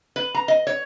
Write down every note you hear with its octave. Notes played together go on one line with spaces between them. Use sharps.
B4
A#5
D#5
C#5